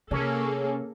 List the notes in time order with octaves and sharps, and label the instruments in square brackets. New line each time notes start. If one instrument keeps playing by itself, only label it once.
[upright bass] C3 [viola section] A#3 G#4 A4 [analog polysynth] C#4